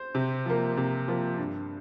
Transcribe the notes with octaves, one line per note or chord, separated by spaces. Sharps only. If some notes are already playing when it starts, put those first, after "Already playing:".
Already playing: C5
C3
F3 A#3
C3
F3 A#3
G2